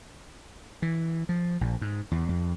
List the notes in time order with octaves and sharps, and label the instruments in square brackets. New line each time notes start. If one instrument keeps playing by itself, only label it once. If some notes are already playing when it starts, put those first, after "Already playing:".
[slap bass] E3
F3
A#1
G#2
E2
F2